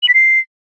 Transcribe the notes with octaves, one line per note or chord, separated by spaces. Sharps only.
F#7
B6
C7